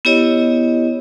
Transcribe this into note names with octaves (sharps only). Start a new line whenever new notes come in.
B3 E4 G4 C#5 D#5